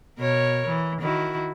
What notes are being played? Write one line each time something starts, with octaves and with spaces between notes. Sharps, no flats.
B2 A#4 C#5
E3
D#3 E4 F#4